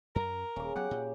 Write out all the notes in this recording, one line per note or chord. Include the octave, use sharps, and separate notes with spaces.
F#2 A#4
D#1 C#3 D6
F#3 B3 G4 F#5
A#2